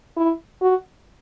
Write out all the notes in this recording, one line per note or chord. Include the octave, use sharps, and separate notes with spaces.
E4
F#4